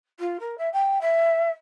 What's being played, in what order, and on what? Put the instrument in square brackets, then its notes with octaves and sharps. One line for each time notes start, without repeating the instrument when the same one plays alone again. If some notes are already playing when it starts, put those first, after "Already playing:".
[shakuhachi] F4
A#4
E5
G5
E5